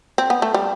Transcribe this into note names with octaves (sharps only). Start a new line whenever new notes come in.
C4
B3
A3
G3